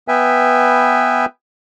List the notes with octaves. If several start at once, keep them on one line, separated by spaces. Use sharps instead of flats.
B3 B4 E5 G5 G#5